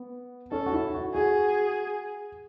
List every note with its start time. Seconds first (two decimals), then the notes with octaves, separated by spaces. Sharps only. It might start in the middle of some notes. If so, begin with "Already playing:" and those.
Already playing: B3
0.51 C#4 A4
0.66 F#4
0.73 E4
0.94 F#4
1.15 F#4 G#4